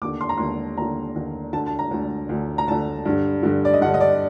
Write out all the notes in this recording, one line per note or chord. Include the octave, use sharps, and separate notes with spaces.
D#2 D3 D6
C6
A#5
D#2 D3 C6
D#2 D3 A#5
D#2 D3
D2 D3 A5
A5
A#5
D2 D3
D2 D3
A#5
D2 D3 A5
G2 D3
G2 D3
D5
D#5
G2 D3 F#5
D#5
D5